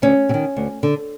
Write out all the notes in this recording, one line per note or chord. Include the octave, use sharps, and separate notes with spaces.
D2 C#4
C3
D#3
D2
D3